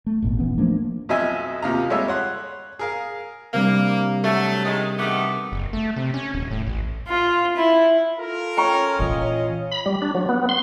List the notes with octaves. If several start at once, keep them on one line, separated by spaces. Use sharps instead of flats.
A3
D#1 G#1 A#2 B3
E3 B3 C#4
F3 A3 A#3 D4
B1 F2 F#3 D#5 E5 G#5
D#2 C3 F4 A#5
G3 G#3 A4 C#5 D#5 E5
C#5 F#5 C6
G#4 A#4 F5
C3 G3 A#3 D4
F#3 A3
D#3 G#3
D#3 A3 B3 F#5 D6
F#1
A3
C3
C#4
D#1
A2
A1
F4
E4
F4 A4 A#4
C#4 G5 A#5 C#6
A#2 E3 F4 C#5 D#5
B5
G3
D4
F#3
B3
C6